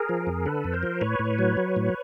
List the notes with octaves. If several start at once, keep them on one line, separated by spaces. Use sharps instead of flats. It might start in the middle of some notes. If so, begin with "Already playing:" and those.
Already playing: G#4 A#4
F3
F2
D3 A4 B4
F2
A#4 C5
F3
A2 B4 C#5
A2
F#3
F#3
A2